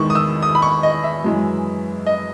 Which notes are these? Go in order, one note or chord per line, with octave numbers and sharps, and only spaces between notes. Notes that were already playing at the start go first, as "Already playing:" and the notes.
Already playing: E2 D#3 G#3 C#6
D#6
E6
D#6
B5
C#6
D#5
E5
F#2 E3 G#3
D#5